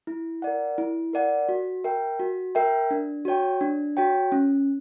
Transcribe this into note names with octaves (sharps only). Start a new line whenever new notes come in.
E4
A#4 D5 F#5
E4
A#4 D5 F#5
F#4
A#4 E5 G5
F#4
A#4 E5 G5
D4
F#4 C#5 G5
D4
F#4 C#5 G5
C#4